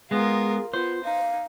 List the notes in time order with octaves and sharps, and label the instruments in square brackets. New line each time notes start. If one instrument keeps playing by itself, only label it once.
[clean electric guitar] G#3 B3 [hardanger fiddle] F4 A#4 [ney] G#4
[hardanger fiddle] B3 [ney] F4 [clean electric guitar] C5
[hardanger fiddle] D#4 [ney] F5